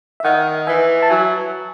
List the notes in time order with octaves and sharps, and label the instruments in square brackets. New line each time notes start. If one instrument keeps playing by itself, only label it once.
[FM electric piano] E5
[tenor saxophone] D#3 [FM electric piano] D#5 F#5
[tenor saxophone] E3 [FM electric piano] E5 G#5
[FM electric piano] A5
[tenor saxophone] F#3 [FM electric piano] E5 G#5